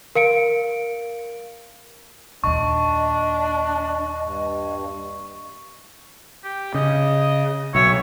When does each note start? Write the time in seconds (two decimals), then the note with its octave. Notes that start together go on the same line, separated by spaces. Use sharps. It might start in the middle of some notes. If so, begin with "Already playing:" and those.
0.15 A#4 F5 C#7 D7
2.44 D#2 A#2 D4 D#5 C#6
4.25 G2
6.44 G4
6.74 C#3 D#5
7.75 B1 C#5 E5